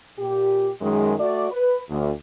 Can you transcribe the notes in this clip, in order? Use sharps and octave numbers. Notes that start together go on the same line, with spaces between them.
A#2 G4
F#2 D#3 G#3
A3 F#4 D5
B4
D2